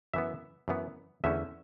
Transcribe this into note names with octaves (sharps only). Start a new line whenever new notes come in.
F#2 E3 B3 E5
F#2 E3 B3
E2 D3 A3 C#4 E5